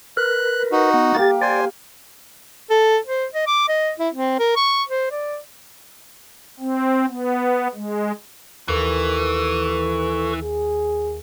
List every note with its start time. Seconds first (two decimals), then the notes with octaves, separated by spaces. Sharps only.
0.17 A#4 B4 F#6
0.72 D#4 F#4
0.94 B3
1.15 A#3 G4 A6
1.42 C5 D5 G#5
2.70 A4
3.07 C5
3.34 D#5
3.47 D6
3.68 D#5
3.99 E4
4.15 C4
4.39 A#4
4.56 C#6
4.89 C5
5.11 D5
6.60 C4
7.08 B3
7.74 G#3
8.68 D#2 E3 A4 B4 C#6
10.41 G#4